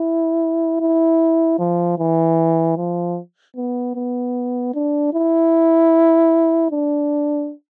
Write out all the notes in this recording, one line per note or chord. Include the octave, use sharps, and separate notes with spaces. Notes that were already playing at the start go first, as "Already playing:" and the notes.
Already playing: E4
E4
F3
E3
F3
B3
B3
D4
E4
D4